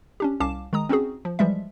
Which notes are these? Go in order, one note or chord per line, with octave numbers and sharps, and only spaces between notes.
C#4 D4 G4
C2 C#4 F5 A5 D6 E7
D#3 G#3 A#5 D#6
C4 C#4 D#4 F#4 G#4
F3
E3 F3 G3 G#3 E5